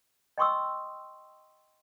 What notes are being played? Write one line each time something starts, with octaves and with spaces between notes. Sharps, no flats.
D#5 G5 C6 C#6 D#6 E6